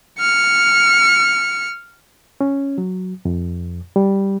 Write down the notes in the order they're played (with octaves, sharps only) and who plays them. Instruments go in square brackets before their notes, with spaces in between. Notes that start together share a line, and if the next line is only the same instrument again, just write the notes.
[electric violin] F6 C#7
[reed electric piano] C#4
F#3
F2
G3